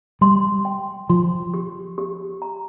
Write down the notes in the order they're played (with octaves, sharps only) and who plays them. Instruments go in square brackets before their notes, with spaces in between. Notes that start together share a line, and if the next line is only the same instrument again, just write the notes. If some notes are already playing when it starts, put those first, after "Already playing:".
[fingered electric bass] G3 [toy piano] C6
[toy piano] G5
[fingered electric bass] F3 [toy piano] C6
[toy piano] G4
G4
A#5